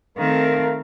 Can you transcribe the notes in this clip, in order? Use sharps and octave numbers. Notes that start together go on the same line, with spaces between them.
D#3 A3 C4 A#4 F5